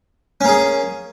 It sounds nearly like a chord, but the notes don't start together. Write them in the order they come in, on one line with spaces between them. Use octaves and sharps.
C#4 A#3 G#4